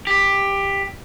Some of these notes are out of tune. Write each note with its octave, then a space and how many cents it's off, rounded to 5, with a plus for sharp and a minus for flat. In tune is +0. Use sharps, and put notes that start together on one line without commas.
G4 +10